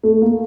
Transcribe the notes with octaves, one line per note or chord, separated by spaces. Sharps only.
A3
A#3